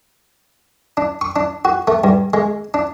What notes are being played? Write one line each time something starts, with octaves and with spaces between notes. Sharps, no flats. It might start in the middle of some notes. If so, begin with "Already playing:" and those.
D4
C#6
D4
F#4
A3
G2
G#3
D4